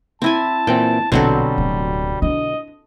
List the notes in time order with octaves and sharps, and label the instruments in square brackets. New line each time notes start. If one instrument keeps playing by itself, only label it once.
[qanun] C4 E4 G#5 [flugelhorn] A5
[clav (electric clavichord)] A#2 E3 C4 [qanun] G5
[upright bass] A#1 [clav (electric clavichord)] B2 D3 F#3 [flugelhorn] G3 [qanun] C4 F#4 A4
[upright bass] D1
[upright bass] D4 E4 [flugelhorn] D#5